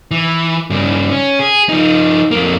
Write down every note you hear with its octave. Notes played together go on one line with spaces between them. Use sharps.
E3
G2 C#3
C#4
G#4
F3 D#4
F2 A#3